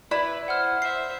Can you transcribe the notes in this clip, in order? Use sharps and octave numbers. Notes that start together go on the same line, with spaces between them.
E4 B4 D5
C5 F#5 F6
C5 E5 C7